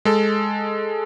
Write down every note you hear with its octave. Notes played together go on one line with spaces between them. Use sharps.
G#3 A4